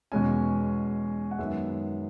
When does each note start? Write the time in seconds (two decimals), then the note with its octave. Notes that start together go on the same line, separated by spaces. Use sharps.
0.12 E2 B2 G#3 C#4 G#5
1.31 F#5
1.38 F#2 D#3 G#3 B3 E5